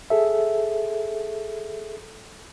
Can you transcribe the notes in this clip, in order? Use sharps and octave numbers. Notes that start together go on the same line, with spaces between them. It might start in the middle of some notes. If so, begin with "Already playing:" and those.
G#4 A4 E5